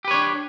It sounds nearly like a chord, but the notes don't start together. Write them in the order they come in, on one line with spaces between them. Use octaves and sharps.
G4 B4 C#5 D4